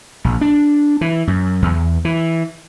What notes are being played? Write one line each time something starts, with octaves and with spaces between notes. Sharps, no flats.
A#1
D4
E3
F#2
E2
E3